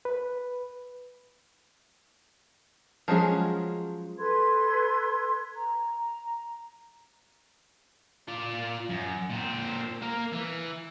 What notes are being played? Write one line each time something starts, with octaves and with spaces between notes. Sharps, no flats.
B4
F3 F#3 G#3 C#4 G#4
A4 B4 C6 G#6
A#5
F4 D5
F#2
A#2 C4
A#3 A#4
E3